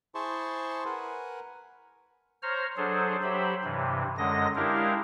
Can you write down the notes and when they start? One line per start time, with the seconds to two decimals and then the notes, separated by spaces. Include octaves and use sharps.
0.15 E4 G#4 C5 A5 C6 C#6
0.85 A#4 B4 F#5 G#5
2.43 C5 C#5 A#5 F6
2.77 F#3 D4 G#4 A4 C5
3.23 F#3 G4 C5 E5 B5
3.64 G2 C3 E3
4.18 F#2 D3 G#3 D#5 A#6
4.55 G#3 D4 E4 G4 A#4 F5